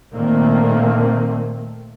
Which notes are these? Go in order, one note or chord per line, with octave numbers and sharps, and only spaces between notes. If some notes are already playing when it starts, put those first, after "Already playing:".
A#2 D#3 A3 A#3 C4